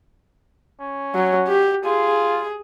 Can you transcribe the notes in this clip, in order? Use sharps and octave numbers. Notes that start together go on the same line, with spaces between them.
C#4
F#3
G4
F4 G#4